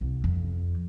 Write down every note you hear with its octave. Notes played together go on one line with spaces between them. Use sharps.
C2
F2